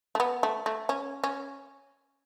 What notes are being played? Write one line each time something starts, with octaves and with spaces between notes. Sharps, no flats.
A3
B3
A3
A3
C#4
C#4